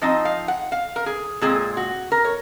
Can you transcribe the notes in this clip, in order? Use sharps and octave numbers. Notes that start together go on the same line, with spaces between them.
F3 C4 D#4 D#5
F5
F#5
F5
A#4
G#4
A#2 G#3 C4 G#4
F#4
A#4
C#5